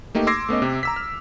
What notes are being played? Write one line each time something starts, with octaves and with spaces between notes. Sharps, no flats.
A3 A#3 D#4 G4
C6 D6 E6 G#6 A#6 C7
A3 B3 C#4 D#5
C3
A#5 E6 B6
F6